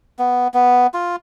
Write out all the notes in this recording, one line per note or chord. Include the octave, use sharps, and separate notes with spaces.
B3
B3
F4